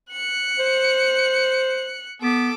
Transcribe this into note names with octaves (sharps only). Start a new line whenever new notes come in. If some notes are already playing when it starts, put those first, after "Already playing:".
F#6 C#7
C5
B3 A4 D6